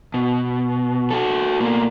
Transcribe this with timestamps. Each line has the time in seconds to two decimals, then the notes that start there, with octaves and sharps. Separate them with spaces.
0.14 B2
1.10 F#4 A4
1.60 B2 A#3